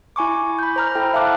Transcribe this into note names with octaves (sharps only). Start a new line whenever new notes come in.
E4 G#5 C#6 D6
B5 G6
C5 A#5 F6
E4 A4 G5
E5 F5 G5 A5 D6 F#6